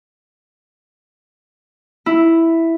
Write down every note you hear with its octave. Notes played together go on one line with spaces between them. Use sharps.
E4